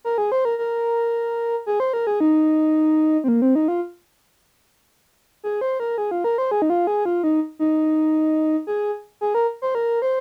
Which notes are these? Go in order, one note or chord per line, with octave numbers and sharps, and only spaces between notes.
A#4
G#4
C5
A#4
A#4
G#4
C5
A#4
G#4
D#4
C4
A#3
C4
D#4
F4
G#4
C5
A#4
G#4
F4
A#4
C5
G#4
D#4
F4
G#4
F4
D#4
D#4
G#4
G#4
A#4
C5
A#4
C5